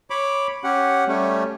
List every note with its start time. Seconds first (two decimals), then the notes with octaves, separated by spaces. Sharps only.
0.10 C#5 B5 D6
0.64 C#4 G4 F#5
1.08 G3 A3 C#4